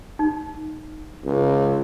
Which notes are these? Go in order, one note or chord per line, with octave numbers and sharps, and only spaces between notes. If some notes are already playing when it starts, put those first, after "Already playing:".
D#4
C#2